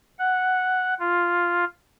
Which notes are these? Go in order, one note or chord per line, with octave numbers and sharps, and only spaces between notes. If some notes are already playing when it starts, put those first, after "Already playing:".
F#5
F4